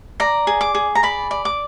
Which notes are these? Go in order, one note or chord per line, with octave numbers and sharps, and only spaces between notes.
D5 A#5
G#4
D6
G#4
A#5
D5 B5
D5
D6